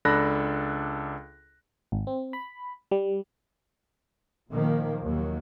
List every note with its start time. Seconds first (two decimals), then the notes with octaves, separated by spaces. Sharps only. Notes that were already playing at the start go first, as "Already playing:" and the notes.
0.05 C#2 D4 A4 B5 F#6 A#6
1.92 G#1
2.07 C4
2.33 B5
2.91 G3
4.50 A#2 D#3 F3 A#3
5.03 D#2 F#3